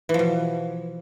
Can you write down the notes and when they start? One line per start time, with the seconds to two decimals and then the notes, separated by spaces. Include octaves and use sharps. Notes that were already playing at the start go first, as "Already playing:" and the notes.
0.09 E3
0.14 F3
0.19 B2